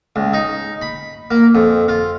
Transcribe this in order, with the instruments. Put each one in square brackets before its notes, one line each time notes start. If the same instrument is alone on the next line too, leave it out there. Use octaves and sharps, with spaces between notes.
[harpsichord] C#2
D#4
B5
A#3
F2
F4